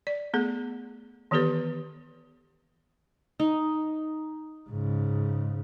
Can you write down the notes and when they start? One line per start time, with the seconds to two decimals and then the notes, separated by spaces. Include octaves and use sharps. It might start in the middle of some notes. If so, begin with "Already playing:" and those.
0.07 D5
0.34 A3 B3 G#4 A4
1.31 D#3 E3 B3 G4 A4 B4
3.40 D#4
4.70 G#2 C#3